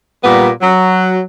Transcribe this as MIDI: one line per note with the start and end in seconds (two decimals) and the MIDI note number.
0.24 0.50 46
0.24 0.50 55
0.24 0.50 58
0.24 0.50 59
0.61 1.20 54